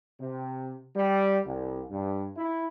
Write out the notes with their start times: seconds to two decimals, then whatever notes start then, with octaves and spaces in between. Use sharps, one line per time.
0.20 C3
0.96 G3
1.45 C2
1.89 G2
2.36 E4